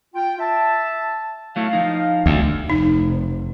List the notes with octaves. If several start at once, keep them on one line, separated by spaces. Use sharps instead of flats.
F4 G5
E5 A5
F#3 A3 E4 F5
F3 D#4
D2
F1 D#4